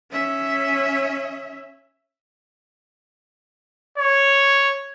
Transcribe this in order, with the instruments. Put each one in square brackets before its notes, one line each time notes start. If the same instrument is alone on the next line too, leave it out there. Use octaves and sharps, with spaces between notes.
[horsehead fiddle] C#4 E5
[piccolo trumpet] C#5